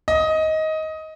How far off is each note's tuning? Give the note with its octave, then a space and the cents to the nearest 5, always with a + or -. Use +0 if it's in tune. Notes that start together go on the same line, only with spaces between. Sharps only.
D#5 +15